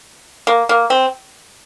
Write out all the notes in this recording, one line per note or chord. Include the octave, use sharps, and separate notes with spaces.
A#3
A#3
C4